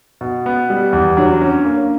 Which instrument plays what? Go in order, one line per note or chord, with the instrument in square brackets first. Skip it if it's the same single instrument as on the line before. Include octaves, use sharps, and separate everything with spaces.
[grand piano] B2
B3
G3
E2
[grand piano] F#3 [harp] D4
[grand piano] C#4
A#3